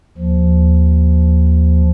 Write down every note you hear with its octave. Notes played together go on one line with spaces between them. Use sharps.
D#2 F3